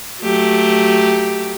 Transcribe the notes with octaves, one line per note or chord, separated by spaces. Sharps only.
F#3 A3 G4